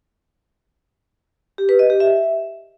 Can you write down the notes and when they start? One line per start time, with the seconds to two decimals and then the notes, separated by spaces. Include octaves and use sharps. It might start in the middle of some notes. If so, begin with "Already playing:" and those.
1.58 G4
1.69 B4
1.79 D#5
1.90 G4
2.00 E5